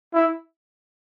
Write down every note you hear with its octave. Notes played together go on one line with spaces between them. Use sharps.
E4